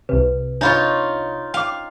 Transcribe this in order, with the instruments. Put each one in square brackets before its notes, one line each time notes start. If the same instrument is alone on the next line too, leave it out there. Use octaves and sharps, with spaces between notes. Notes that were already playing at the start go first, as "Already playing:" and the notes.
[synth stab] C2 C3 [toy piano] B4
[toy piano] D4 D#5 B5 [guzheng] D#4 F4 C#5
[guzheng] F5 [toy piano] G5 D6